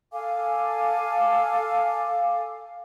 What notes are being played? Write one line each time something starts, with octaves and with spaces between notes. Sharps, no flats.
A4 F5 G#5 D6